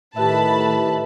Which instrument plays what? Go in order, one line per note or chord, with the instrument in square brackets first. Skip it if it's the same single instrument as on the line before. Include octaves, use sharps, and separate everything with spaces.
[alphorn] A2 [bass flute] D#3 [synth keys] G4 B4 E5 [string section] A5 B5